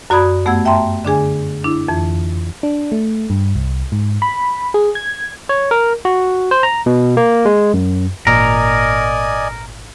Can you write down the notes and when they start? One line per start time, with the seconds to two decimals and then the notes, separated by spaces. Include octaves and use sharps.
0.10 F#2 F#4 D5 B5 D#6 G#6
0.45 G2 A3 B3 F#5 E6 G#6
0.65 E5 G5 A5 A#5 C6
1.05 D3 D4 G#4 G#5
1.64 D4 E4
1.88 F2 E3
2.63 D4
2.92 A3
3.30 G2
3.55 C2
3.92 G#2
4.22 B5
4.74 G#4
4.95 G#6
5.49 C#5
5.71 A#4
6.05 F#4
6.51 C5
6.63 A#5
6.86 B2
7.17 A#3
7.45 G#3
7.74 F#2
8.27 G#1 A#2 A#4 D5 D#5 G#5